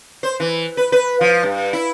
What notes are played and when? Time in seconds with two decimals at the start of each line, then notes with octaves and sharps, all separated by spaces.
0.23 C5
0.40 E3
0.77 B4
0.92 B4
1.21 F3
1.43 G2
1.73 E4